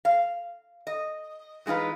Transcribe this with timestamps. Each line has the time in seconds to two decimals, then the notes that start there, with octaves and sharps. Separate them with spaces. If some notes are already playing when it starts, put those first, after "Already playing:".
0.05 F5
0.87 D#5
1.66 E3 G#3 D#4 F4 B4